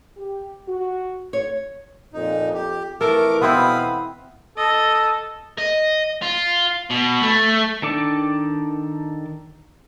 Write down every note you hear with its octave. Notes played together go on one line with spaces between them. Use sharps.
G4
F#4
C#5
F2 A#2 D#4
G4
F2 E3 A3 A4 A#4 D6
B2 B3 C4 E4 F5 B5 D#6
A4 D#5
D#5
F4
B2
A3
D#3 D4 A4 D5 D6